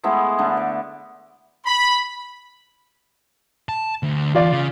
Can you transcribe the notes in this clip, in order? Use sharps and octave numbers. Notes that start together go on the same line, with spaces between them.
G#3 A3 B3 E4
D3 A3
D5
B5
A5
D2
E2 F4 D5
C#3